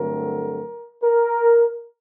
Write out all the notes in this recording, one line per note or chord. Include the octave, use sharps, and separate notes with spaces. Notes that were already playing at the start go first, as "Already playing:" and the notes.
Already playing: G2 D3 F#3 A3 C4 A#4
A#4